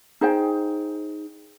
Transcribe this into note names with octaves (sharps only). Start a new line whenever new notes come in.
D#4 G#4 C5 G5